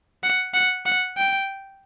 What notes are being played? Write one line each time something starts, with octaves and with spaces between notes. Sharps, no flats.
F#5
F#5
F#5
G5